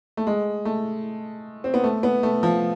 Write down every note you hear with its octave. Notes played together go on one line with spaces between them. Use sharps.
A3
G#3
A3
C4
B3
A3
B3
A3
F3